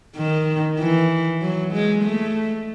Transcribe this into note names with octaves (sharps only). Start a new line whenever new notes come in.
D#3
E3
F#3
G#3
A3